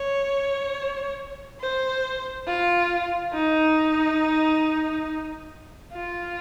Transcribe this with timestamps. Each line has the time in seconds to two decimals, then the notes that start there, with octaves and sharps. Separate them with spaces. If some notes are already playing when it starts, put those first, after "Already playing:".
Already playing: C#5
1.61 C5
2.47 F4
3.33 D#4
5.93 F4